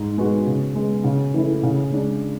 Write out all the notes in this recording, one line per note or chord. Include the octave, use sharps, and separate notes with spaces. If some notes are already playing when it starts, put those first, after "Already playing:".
Already playing: G#2
G#3 B3 F#4
C#3
G#3 B3
C#3
E3 A3 E4
C#3
G#3 D4